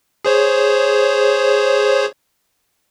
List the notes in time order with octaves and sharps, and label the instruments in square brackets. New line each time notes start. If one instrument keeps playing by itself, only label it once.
[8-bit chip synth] G#4 C5 C#5